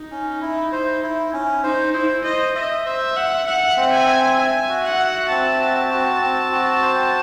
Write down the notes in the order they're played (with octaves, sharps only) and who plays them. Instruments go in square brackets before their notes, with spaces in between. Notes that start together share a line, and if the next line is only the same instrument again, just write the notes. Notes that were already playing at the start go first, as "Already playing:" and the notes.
Already playing: [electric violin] D#4
[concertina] C#4
E4
C5
E4
C#4
[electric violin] D#4 [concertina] C5
[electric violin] E4 [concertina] C5
[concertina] C5 [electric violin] D#5
[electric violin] D#5 [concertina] E5
[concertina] C5 [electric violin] E5
[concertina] E5 [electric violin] F#5
[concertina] E5 [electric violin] F#5
[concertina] C4
[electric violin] G#5
[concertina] E5
[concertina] E5 [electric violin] G#5
[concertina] F#4
[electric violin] F#5
[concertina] E5
[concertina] C4 [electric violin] A5
[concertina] F#4
F#4
C4
F#4
C5